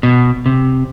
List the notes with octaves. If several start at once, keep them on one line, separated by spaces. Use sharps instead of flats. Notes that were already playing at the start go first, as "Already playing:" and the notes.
B2
C3